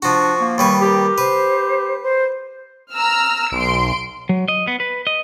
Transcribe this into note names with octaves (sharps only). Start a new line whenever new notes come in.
F3 D4 F#4 C#6
A#3
D#2 G3 B4 C#6
G4 A#4
B4 C5
C5
A#5 E6 F6
B1 C6 D7
F#3
D#5
B3
B4
D#5